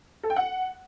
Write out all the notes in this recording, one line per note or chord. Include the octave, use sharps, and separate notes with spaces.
A4
G5
F#5